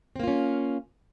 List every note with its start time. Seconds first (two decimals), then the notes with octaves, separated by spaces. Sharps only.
0.16 C4
0.20 A#3
0.24 F4
0.27 C#4